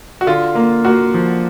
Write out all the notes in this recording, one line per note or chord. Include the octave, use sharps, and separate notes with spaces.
F#4
D3 F4
A#3
A#3 F#4
F3